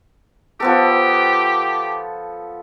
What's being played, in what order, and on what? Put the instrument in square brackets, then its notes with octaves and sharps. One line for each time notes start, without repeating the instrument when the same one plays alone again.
[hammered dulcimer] F3 B3 A4 [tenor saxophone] G4